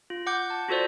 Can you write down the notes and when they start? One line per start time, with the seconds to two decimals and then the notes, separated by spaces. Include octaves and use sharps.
0.10 F4
0.27 F#5 D6 G6
0.50 A5
0.68 F4 F#4 A4 C5 D5